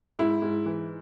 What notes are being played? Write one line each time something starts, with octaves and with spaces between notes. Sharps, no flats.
G#2 E4
G#2
E3